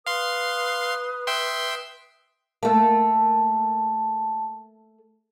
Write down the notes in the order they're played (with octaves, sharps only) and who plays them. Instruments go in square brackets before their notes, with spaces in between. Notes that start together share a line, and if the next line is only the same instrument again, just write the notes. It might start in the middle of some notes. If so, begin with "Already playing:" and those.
[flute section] B4 D#6 [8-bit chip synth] F5 C6
[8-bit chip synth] E5 G5 C6
[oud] A3 A#3 [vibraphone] A5